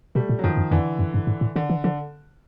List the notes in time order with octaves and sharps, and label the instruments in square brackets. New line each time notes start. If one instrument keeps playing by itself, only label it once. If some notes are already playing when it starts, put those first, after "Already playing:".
[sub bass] B2 [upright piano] G3 A3
[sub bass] A#2
[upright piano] F#3
[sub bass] F#2 [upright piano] D#3 F3
[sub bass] F#2
[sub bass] F2 [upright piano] D3 E3
[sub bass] F#2
G2
G#2
A2
[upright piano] D3 [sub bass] D#3
[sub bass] E3
[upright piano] D3 [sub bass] F3